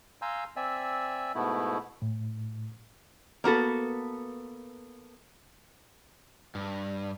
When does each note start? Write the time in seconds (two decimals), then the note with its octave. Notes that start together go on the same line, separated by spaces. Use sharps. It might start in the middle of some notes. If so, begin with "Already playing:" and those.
0.22 F5 G#5 A#5 C6 E6 G6
0.56 C4 D5 E5 G#5 E6
1.35 G#2 B2 A3 B3 E4
2.02 A2
3.44 A#3 B3 F#4 A4
6.55 G2